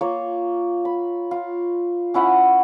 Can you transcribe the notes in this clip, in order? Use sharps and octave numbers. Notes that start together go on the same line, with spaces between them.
A#3 F4 C#5
B5
F4
C#4 E4 F#5 B5